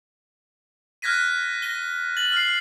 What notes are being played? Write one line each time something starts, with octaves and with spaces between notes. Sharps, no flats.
F6 F#6 G#6 A#6 B6 D#7
A#6 D#7 G7
A6 F#7
F6 C7